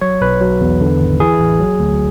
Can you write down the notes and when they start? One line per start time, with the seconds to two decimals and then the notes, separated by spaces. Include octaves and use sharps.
0.01 F#3 C#5
0.21 B1 B4
0.41 F#3
0.61 E2
0.81 D3
1.00 G#1
1.20 E3 G#4
1.40 A1
1.60 F#3
1.79 D2